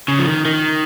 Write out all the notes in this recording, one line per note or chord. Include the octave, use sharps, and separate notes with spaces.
C#3
F3
D#3
D#3